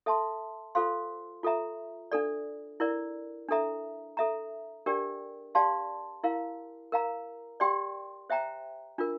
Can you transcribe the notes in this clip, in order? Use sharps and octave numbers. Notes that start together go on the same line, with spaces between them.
A4 E5 A5 C6
F4 A4 C5 F5 C6
F4 A4 E5 A#5
D4 A4 D5
E4 A#4 D5
D4 A4 E5 A#5
A4 E5 A#5
D4 G4 A#4 D5 G5
G4 D5 F5 A5 C6
E4 A#4 F5
A#4 F5 A#5
G4 D5 G5 C6
C5 E5 G5 A#5
D4 F4 A#4